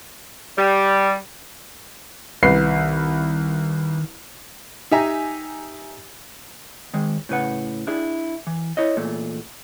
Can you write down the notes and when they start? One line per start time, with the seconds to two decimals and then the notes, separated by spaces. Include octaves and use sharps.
0.57 G3
2.43 C2 D#3 B4 C7
4.91 D#4 G4 E5 G#5 A#5
6.94 D#3 G#3
7.29 A2 C#3 B4 F#5
7.87 D4 E4 G#4
8.47 E3
8.77 E4 C#5 D#5
8.97 E2 A#2 A3